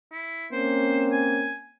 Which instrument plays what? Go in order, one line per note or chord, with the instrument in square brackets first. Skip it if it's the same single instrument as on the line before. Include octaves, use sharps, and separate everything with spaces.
[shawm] E4
[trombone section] A#3 C4 C#4 [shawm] C5
[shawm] G#5